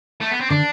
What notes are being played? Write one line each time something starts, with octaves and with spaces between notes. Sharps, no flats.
A3
B3
C4
D3 D4